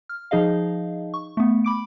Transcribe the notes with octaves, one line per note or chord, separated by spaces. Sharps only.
F6
F3 D#4 G#4 D#5 F5
C#6
A3 B3
B5 D6 D7